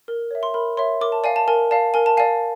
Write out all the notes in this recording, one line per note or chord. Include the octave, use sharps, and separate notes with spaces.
A#4
C#5 E5
C6
A#4 B5
C#5 E5 C6
A#4 D6
A5
D5 F5 G#5
A5
A#4 G#5
D5 F5 A5
A#4 G#5
A5
D5 F5 G#5